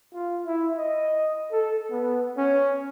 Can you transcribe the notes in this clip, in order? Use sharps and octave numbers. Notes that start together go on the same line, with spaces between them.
F4
E4
D#5
A4
B3
C#4